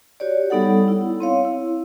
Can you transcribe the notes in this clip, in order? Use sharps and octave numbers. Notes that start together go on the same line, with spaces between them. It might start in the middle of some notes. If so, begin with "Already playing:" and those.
F#4 G4 C#5 D5
G3 B3 D#4 A4 F#5
E4
C4 C#5 F5
E4